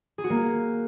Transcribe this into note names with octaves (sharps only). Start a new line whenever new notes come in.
G#4
F#4
A#3